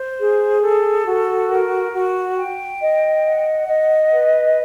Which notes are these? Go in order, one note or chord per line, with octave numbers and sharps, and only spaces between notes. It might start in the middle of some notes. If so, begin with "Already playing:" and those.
Already playing: C5
G#4
A4
F#4
A#4
F#4
G5
D#5
F#5
D#5
B4